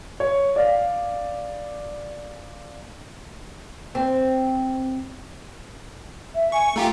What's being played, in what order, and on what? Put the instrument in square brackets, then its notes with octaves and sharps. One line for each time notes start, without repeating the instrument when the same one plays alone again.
[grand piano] C#5
D5 F5
[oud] C4
[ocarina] E5
[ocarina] G#5 [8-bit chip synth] C#6
[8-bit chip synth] A3 F4 G4 [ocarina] A#5